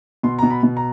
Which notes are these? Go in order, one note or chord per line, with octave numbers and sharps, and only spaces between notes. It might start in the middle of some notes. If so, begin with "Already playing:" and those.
B2 C6
B2 A#5
B5
B2
A#5